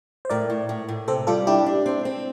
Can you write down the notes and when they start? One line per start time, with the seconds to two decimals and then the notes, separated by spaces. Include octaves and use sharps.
0.25 C5
0.30 A2 A#4 D5
0.50 A2
0.69 A2
0.89 A2
1.08 C3 A4 C5
1.27 G3 F4 A4
1.47 D4 E4 G4
1.66 D4
1.86 C4
2.05 C4